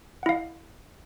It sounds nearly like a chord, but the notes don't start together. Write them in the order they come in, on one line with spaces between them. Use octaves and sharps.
F#5 E4 F5 D#5